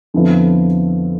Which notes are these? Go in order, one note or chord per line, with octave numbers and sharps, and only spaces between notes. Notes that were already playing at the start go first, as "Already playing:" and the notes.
F2 D3 F3 B3 E4